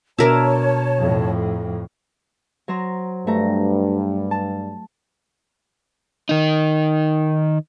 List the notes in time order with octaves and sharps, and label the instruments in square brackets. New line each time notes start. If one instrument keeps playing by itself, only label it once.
[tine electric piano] B2 [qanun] D4 A#4 E5 [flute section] C#5 A5
[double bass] F2 A2
[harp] F#3 C5 A#5
[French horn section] G2 [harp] A3 A#5
[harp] A5
[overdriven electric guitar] D#3 D#4